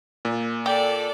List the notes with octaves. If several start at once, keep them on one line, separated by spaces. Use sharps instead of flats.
A#2
G4 A4 D5